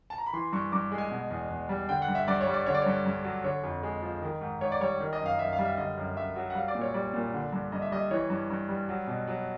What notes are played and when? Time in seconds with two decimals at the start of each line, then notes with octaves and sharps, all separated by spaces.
0.10 A5
0.18 A#5
0.26 B5
0.33 E3 C6
0.53 G2 C#6
0.72 G2 D6
0.92 G#3
0.98 G#5
1.11 B2
1.30 E2
1.50 E2
1.69 G3
1.89 D3 G5
2.02 F#5
2.08 G2
2.15 E5
2.28 G2 D5
2.41 C#5
2.47 G3
2.53 D5
2.66 D3 C#5
2.74 D5
2.82 G2 C#5
3.06 G2
3.24 F#3
3.44 D3 C#5
3.64 F2
3.83 G#3
4.02 F3
4.22 D#3
4.41 G#2
4.61 G#2 C#5
4.72 D5
4.81 G3 C#5
5.00 D#3
5.13 D#5
5.19 F#2
5.26 F5
5.39 F#2 E5
5.53 F5
5.59 G3
5.65 E5
5.77 D3 D#5
5.97 F#2
6.16 F#2 E5
6.36 F#3
6.50 F#5
6.55 G3 F5
6.68 D5
6.75 A#2
6.81 C#5
6.94 G3 D5
7.14 A#2
7.33 D3
7.52 G2
7.72 G2 D#5
7.82 E5
7.91 G3 D#5
8.11 E3 C#5
8.30 G2
8.50 G2
8.69 G3
8.88 F#3
9.08 B2
9.27 F#3